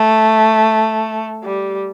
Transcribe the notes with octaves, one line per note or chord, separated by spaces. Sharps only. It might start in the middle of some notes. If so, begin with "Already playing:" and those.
Already playing: A3
G3